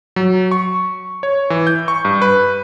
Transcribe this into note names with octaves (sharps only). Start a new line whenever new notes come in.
F#3
C#6
C#5
E3
G6
C#6
G2
B4